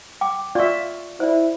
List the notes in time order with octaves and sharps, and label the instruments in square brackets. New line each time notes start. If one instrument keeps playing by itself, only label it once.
[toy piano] G5 D6
[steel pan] F4 E5 [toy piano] D5 C#6
[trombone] E4 [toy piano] C5 D5